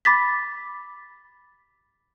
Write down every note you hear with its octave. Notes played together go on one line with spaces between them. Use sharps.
B5 D6 A6 B6